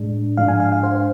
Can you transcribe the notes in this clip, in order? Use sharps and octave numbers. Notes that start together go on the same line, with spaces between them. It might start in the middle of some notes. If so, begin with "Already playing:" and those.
Already playing: A2 G#3 D4
G#2 F3 G#3 D4 F5
G#5
F5
F5
C5
C5